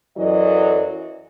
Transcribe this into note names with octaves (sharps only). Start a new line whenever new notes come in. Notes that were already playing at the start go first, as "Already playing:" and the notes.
F#2 E3 F#3 A4 D5 D#5